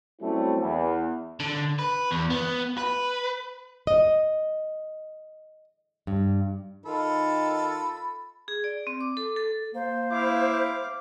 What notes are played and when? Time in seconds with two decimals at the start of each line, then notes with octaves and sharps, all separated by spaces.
0.22 F#3 G3 A3 C4 C#4 E4
0.61 E2
1.40 D3
1.79 B4
2.11 E2
2.30 B3
2.78 B4
3.87 D#5
6.07 G2
6.86 D#3 F4 A4 B5
8.48 G#4
8.64 D5
8.87 C4
9.01 D6
9.17 A4
9.36 A4
9.74 A#3 C5
10.11 E4 F5 D6